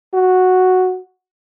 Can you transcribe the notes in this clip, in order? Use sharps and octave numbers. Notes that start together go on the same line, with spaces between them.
F#4